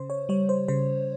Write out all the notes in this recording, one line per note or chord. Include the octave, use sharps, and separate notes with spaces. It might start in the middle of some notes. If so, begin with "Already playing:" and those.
Already playing: C#3 C5
C#5
G3 C#5
C5
C#3 C5